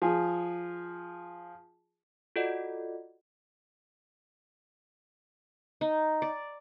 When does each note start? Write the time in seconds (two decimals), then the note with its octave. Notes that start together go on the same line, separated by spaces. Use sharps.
0.02 F3 G#4
2.36 F4 F#4 A4 D5 D#5 F#5
5.81 D#4
6.22 D5